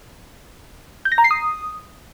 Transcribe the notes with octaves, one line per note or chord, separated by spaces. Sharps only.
G6
A#6
A#5
C7
D#6